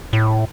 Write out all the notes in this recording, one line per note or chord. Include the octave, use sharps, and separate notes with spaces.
A2